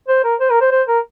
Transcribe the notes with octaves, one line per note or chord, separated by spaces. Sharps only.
C5
A#4
C5
A#4
C5
C5
A#4